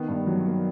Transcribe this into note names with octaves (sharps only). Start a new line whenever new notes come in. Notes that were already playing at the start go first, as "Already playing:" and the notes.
Already playing: D#3 B3
G2
F#3
A#3